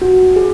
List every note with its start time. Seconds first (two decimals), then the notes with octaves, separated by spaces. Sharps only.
0.02 F#4
0.36 G#4